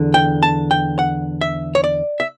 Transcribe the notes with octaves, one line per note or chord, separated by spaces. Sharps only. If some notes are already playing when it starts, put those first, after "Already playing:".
Already playing: E2 D3
G5
A5
G5
F#5
E5
C#5
D5
E5